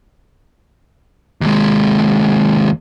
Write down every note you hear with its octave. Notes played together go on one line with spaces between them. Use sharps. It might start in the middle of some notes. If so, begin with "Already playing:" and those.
D#2 G#3